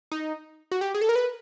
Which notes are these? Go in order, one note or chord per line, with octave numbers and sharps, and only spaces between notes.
D#4
F#4
G4
G#4
A4
A#4
B4